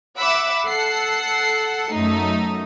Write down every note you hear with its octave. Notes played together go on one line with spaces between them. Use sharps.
E5 F#5 B5 D6 E6
A4 F#5 C7
F#2 A3 D#4